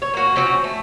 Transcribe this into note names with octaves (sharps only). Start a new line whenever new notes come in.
C#5
A#3 F#4
F3 C4 C#4 F#4
A3